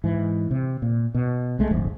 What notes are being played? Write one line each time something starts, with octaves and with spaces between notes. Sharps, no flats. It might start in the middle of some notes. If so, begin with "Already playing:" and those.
G#2 E3
C3
A#2
B2
C2 G#3 A3
D1 G1 F3